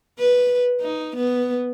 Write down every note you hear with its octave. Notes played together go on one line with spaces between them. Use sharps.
B4
D#4
B3